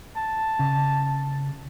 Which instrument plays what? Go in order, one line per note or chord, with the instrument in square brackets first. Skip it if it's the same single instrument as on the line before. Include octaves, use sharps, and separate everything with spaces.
[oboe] A5
[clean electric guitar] C#3